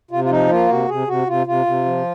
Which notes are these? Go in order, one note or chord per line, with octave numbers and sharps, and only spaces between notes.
C3 F4
F4
F3 D#4
A#3 F4
C3 F#4
C3 G#4
C3 F#4
C3 F4
C3 F4
C3
F3